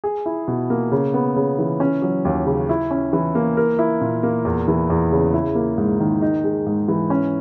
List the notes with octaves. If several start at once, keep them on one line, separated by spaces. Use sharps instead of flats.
G#4
E4
B2
A#3
C#3
B3
C#3
E3
C#4
F#3
D#2
C#3
E4
C#4
E3
A#3
A#4
E4
A#2
A#3
E2
E3
E2
C#3
E4
A#3
G#2
D#3
D#4
G#3
G#2
E3
C#4